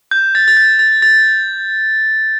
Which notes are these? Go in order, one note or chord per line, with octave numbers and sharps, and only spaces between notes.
G6
A6
A6
G6
A6
A6